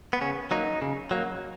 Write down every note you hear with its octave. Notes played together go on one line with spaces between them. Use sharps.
B3
C#3 C#4
F#3 A#3 D#4
C#3
F#3 A#3